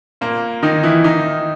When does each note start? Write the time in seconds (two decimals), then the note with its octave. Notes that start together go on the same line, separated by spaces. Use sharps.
0.21 A#2 A#3
0.63 D#3 D#4
0.83 E3 E4
1.04 D#3 D#4